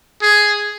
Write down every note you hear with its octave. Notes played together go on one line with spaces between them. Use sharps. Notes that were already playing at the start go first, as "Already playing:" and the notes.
G#4